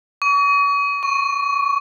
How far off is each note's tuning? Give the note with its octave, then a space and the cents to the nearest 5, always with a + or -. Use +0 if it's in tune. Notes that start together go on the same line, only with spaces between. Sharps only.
C#6 +40
C#6 -5